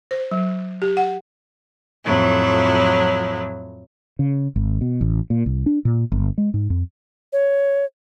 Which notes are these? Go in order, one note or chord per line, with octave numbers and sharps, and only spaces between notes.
C5
F#3
G4
F#5
F2 A2 F3 F#3 E4
C#3
G#1
B2
A1
A#2
C2
D4
A#2
G1
G#3
G#2
F2
C#5